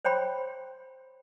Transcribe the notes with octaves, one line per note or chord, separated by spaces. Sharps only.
C5 C#5 G5 B5 C6